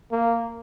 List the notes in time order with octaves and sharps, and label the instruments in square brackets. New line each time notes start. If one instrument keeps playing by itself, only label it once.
[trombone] A#3